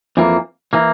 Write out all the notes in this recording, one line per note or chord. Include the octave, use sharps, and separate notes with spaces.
F2 E3 A#3
E3 A#3